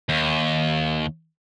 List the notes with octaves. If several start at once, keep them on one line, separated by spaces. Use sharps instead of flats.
D#2